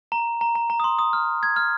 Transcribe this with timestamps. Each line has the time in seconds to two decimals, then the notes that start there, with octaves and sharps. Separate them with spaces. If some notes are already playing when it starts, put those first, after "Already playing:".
0.12 A#5
0.41 A#5
0.55 A#5
0.70 A#5
0.80 D#6
0.84 C6
0.99 D#6
1.13 F6
1.43 G#6
1.56 F6